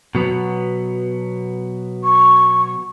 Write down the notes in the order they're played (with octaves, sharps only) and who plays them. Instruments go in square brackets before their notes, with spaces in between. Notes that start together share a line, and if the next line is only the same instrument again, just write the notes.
[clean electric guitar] B2 F#3 B3
[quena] C#6